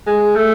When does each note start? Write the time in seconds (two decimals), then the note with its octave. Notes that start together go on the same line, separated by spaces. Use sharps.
0.07 G#3
0.36 A3